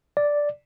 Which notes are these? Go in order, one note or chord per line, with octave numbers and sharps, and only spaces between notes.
D5